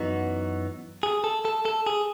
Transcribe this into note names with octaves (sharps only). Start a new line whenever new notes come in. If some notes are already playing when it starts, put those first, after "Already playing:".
Already playing: F#2 E3 B3 D#4 F#4
G#4
A4
A4
A4
G#4